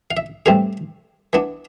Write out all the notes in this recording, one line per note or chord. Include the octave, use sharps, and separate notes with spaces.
F5
E5
A2 E3 G3 C4 F5
E3 B3 D4